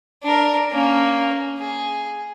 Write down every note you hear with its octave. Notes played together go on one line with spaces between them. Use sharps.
D4 A#4
A#3 C#4
G#4